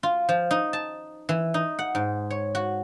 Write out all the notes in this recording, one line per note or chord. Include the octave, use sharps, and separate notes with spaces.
F4
F3
D#4
A5
E3
D#4
F#5
G#2
C#5
F#4